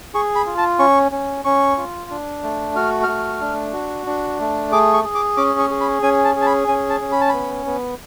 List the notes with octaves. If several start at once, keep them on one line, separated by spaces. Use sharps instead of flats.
G#4 C#6
B5
F4
A5
C#4 C#6
C#4
C#4 C#6
F4
D4
A3
F#4 F6
A3 F6
D4
F#4
D4
A3
G#4 D6
C#6
G#4
D6
C#4 D6
C#6
G#4
B5
C#4 G#5
A5
G#4
A5
B5
C#4 G#5
A5
C#4
B5
A5
B3 B5
B3